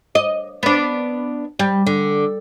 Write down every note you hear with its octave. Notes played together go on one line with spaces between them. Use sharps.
D#5
B3 D4
G3
D3